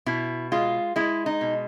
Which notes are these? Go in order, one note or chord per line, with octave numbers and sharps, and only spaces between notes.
B2 E4
G#3 F4
G#3 E4
D#4
B2